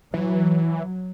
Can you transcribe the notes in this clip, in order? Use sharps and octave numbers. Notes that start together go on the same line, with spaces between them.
E3 F#3